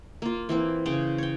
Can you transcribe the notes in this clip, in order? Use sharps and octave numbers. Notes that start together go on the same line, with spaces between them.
A#3 F4
E3 A#3 C4
C#3 C#4 C5 G5
C#5 G5